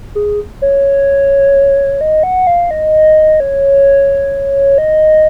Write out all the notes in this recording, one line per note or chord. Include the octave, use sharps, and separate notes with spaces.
G#4
C#5
D#5
F#5
F5
D#5
C#5
D#5